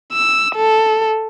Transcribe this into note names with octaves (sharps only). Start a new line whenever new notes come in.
E6
A4